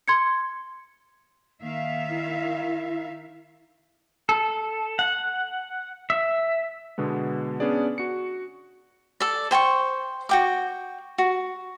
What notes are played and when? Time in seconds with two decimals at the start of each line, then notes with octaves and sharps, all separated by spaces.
0.08 C6 G#6 C#7
1.62 D#3 A#3 E5 F5
2.09 E4
4.29 A4
4.99 F#5
6.10 E5
6.98 B2 D3 G#3 B3
7.60 B3 C#4 D4 G#4 D5
7.98 F#4 C#7
9.20 A4 D5
9.51 C5 G5 G#5 C#6
10.29 F#4 G5 D6
11.18 F#4